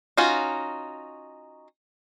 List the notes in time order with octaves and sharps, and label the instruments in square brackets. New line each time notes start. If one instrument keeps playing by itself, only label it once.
[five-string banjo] C#4 D#4 F4 F#4